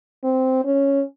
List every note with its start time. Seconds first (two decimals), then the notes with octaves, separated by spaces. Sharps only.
0.24 C4
0.65 C#4